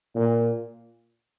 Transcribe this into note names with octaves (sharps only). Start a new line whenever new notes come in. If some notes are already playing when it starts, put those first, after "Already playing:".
A#2